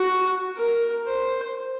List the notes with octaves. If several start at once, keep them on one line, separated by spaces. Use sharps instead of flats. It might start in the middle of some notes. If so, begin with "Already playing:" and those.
Already playing: F#4
A#4
C5